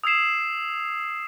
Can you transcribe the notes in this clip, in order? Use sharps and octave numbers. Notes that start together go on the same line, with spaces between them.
D#6 E6 G#6 C7 E7